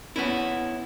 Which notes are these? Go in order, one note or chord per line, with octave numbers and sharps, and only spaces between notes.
B3 C#4 E4